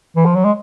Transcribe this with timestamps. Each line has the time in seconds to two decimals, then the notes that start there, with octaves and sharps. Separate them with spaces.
0.16 E3
0.26 F3
0.35 F#3
0.45 G#3